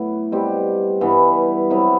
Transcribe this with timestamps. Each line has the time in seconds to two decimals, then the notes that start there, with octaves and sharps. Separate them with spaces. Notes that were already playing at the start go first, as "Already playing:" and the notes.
Already playing: A2 F#3 B3 E4
0.32 B2 G3 C4 G4
1.01 G2 E3 B3 E4
1.70 C3 F#3 B3 E4